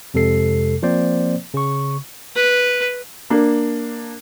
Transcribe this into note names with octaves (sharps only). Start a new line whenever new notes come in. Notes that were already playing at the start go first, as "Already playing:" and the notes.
F2 C3 G#3 A4 C7
F3 A#3 C4 C5 D5
C#3 C#6
B4
A#3 D4